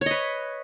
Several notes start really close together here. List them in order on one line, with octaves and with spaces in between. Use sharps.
C#5 D#5 B4